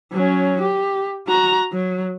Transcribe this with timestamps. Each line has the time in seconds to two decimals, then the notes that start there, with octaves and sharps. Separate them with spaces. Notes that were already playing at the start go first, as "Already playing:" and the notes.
0.12 F#3 C#4
0.61 G4
1.27 F#4 A#5
1.72 F#3